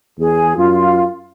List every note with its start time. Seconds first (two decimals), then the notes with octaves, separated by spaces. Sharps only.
0.19 E2 G#4
0.57 F#2 F4